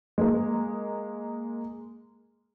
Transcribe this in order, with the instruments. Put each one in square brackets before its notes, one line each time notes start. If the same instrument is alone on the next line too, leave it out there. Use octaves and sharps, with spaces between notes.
[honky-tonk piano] G#3 A#3